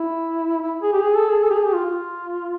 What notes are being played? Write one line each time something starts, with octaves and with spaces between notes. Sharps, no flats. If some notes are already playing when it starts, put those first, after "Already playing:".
Already playing: E4
E4
G#4
G4
G#4
A4
G#4
A4
G4
G#4
G4
F4
F4